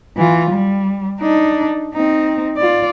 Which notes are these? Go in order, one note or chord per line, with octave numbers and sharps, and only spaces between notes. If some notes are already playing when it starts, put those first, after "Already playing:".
E3 F4
G3
D4 D#4
C4 D#4
F4 D5